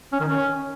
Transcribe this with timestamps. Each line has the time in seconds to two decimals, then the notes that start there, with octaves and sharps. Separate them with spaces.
0.13 C#4
0.20 D#3
0.28 C#4